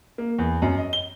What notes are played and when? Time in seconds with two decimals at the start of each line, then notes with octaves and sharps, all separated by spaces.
0.18 A#3
0.39 E2
0.62 F#2
0.78 D#5
0.93 G7